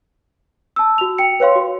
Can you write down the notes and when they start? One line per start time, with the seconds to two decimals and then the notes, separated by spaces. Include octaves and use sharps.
0.76 A5 E6
0.98 F#4 F7
1.18 G5 C#7
1.40 B4 C#5 F5 C6
1.56 F#4